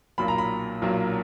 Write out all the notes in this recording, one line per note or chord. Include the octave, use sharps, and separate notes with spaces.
B1 A#2 F#3 A#3 B5
A#5
B5
B1 A#2 F#3 A#3